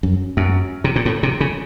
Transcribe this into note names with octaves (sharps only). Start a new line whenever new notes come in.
F#2
F#2
C3
A#2
A2
C3
C#3